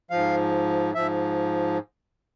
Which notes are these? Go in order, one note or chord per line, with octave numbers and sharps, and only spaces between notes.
G#2 F3 F5
G#2 F3 E5